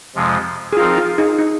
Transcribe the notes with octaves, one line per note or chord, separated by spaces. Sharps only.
F2 C3 F3 G#3
G#4
F3 C4 D#4 F4 A#4 F5
F4
D#4 G#4
D#4